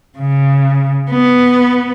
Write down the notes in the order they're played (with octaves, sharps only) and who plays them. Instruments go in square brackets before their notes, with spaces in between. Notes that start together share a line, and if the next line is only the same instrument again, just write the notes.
[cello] C#3
B3